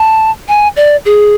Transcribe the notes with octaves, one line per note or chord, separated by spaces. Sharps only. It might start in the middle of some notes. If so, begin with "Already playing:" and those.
Already playing: A5
G#5
D5
G#4